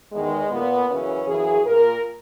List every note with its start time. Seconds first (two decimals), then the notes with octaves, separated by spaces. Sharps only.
0.12 E2 D#3 G#3
0.50 A#2 B3
0.88 F#2 C#3 E3 C#4
1.26 F#2 C#3 E3 G#4
1.65 A#2 A#4